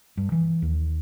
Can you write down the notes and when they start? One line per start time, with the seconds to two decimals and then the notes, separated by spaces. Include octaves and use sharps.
0.17 G2
0.32 E3
0.62 D#2